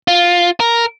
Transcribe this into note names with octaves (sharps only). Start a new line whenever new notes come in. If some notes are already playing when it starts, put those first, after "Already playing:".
F4
A#4